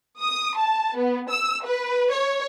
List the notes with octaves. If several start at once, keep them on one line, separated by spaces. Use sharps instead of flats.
D#6
A5
B3
E6
B4
C#5